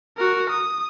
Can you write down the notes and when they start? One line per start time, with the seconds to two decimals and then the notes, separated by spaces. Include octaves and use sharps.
0.18 F#4 A#4
0.50 D#6